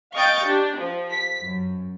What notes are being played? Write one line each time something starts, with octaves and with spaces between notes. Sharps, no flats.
D#5 F5 G5 C#6 G6 A6
D4 G4
F3
B6
F#2